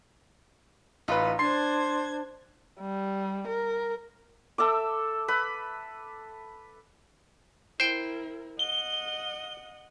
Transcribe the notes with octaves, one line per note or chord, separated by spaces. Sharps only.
A1 D#4 F4 B4 E5
D4 C5 A5 C6 G#6 C7
G3
A#4
A4 E5 D6
B4 B5
E4 A#4 C5 G5
D#5 F#5 G7